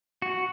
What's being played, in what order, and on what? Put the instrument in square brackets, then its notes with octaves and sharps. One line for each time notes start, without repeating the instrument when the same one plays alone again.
[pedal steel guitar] F#4